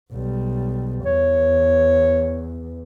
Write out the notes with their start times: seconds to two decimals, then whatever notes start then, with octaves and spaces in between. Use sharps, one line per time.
0.12 B1 G3
1.05 E2 C#5